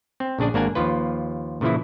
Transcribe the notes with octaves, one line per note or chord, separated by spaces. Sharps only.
C4
A#1 C#3 D4 G#4 D5
G#1 A#3 D4 A#4 F#5 G#5
D#2 F3 F4 B4
A#2 C#3 E3 F3 E4